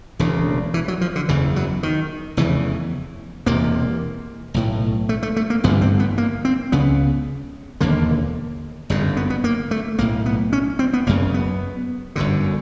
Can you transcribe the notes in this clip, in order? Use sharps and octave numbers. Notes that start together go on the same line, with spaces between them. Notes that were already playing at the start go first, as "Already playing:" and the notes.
E1 D2 C#3 E3
E3
F#3
F3
D3
F#1 E2 C#3 E3
F#3
D#3
F1 E2 C#3 E3
E1 E2 C3 A#3
B1 A2
A3
A3
A3
A#3
A1 G2 D3 B3
C4
B3
A#3
C4
C#2 C#3 B3
E1 D#2 D3 A#3
G1 F#2 C#3
B3
B3
A#3
A3
B1 A2 A#3
B3
C#4
C4
B3
F#1 F#2 C#3 A#3
B3
G1 F#2 D3